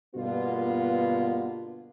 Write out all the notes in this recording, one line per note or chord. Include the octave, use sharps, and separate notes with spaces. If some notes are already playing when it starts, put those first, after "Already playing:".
G2 B2 D3 A#3 B3 F4